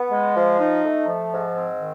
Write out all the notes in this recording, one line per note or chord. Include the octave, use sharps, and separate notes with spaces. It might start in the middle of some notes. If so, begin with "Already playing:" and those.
Already playing: B3
G#3
F3
D#4
A3
F3
G#2
C4
D#3